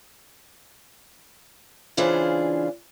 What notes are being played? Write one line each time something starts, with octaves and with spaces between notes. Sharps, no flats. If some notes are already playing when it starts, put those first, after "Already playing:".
C#3 E3 D4 F4 G#4 C5